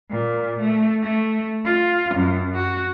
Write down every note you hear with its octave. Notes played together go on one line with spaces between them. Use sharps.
A#2
A3
A3
F4
F#2
F#4